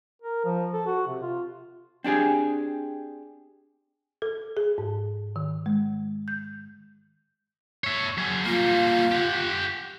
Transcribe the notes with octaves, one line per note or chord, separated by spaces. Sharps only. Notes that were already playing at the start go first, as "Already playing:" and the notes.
A#4
F3
A4
F#4
C3
F4
C4 D4 G4 G#4
A4
G#4
G#2
D#3
G#3
G6
C#5 E5
F#3 G#4
G3 A#3 F4
G4 F#5